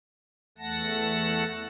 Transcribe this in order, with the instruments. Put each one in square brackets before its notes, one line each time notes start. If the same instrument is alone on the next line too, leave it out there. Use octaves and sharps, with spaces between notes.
[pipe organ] E2 A3 F#5 A5 A#6